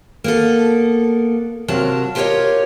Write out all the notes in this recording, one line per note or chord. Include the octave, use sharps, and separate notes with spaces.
A#3 B3 A4
C3 F#3 F4 A#4 A5
F4 G4 A#4 C5 C#5 D#5